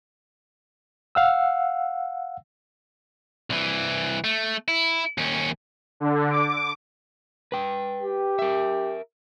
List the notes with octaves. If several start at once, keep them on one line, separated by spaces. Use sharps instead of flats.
F5 F#5 E6
C2 E3
A3
E4
D#2 C#4
D3
D6
B4 G5
G4
A#4 E5